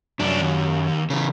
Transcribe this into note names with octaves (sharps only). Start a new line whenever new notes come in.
C2 F#2 D4
D#2
C#3 E3